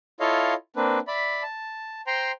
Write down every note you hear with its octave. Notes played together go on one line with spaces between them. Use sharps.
E4 F4 A4 C#5 D#5 F5
A#3 C4 D4 B4
D5 E5 B5
A5
C5 G5 A#5 C6